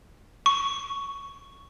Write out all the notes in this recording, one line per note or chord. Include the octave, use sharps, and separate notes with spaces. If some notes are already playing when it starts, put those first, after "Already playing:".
C#6